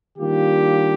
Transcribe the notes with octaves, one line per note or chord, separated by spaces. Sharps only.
D#3 G3 A#3 D4 F4 G4